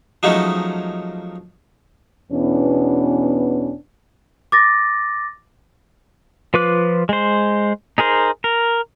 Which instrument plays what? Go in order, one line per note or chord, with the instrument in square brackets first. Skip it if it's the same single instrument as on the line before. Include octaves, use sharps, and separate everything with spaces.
[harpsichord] F3 F#3 G#3 A3 C#4 D#4
[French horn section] E2 B2 E3 B3 C#4 D4
[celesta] D6 A6 A#6
[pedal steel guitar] F3 F4 B4 D6 F#6
G#3 C5
D#4 G#4 A#4 C5
A#4